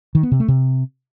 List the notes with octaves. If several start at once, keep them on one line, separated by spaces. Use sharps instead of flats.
D#3
B3
C3
A3
C3